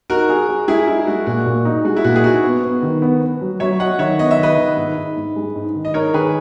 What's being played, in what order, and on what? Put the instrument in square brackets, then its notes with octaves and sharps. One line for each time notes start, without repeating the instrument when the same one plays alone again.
[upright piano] D#4 [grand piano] F#4 A#4
[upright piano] G#4
G#4
[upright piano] G#3 [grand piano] E4 G#4
[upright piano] D#4 [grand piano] E4
[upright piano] G#3 [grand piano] F#4
[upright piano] A#2 [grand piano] F#4
[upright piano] A#2
D#4
[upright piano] G#3 [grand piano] F#4
[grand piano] E4
[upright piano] A#2 [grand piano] F#4
[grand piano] G#4
[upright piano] D#4 [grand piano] F#4
[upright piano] B3
B3
D#3
B3
B3
F#3
[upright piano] F#3 [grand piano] C#5 E5
[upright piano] F#3 [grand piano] D#5 F#5
[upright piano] D#3 [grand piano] C#5 E5
[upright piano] B3 [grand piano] D#5
[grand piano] E5
[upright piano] D#3 [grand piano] B4 D#5
[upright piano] D#3
G#2
G#2
G#2
G#3
G#2
D#3
[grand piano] D#5
[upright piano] G#2 [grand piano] A#4 C#5
[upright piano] D#3 [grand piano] G#4 B4